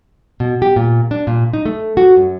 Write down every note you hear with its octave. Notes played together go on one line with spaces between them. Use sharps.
B2
G4
A#2
D4
A#2
D#4
A3
F#4
F#2